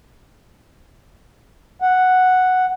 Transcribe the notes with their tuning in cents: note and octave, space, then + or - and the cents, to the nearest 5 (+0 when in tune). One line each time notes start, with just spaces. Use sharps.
F#5 +0